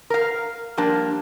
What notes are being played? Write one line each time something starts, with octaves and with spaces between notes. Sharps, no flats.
A#4 F5
F3 G3 A#3 D4